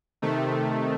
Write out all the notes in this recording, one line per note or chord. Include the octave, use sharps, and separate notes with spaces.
C3 D#3 A3